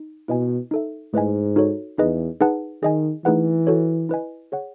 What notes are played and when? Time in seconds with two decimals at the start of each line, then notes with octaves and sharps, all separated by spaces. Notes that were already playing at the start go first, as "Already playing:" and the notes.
Already playing: D#4
0.28 B2 E4 B4 D#5 G#5
0.71 D#4 A4 E5
1.14 G#2 A3 E4 B4 D#5 G#5
1.56 D#4 F#4 A4 C#5
1.98 E2 D#4 G#4 B4 D#5
2.41 D#4 G#4 B4 F#5 A5
2.83 D#3 G#4 D#5 G#5
3.25 E3 A3 D#4 G#4 B4 F#5
3.67 F#4 A4 C#5
4.09 E4 B4 D#5 G#5
4.52 G#4 C#5 F#5